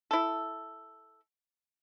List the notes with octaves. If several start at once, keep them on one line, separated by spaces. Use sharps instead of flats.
E4 A4